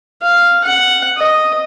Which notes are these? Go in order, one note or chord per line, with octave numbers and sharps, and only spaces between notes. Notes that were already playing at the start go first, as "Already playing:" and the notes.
F5
F#5
D#5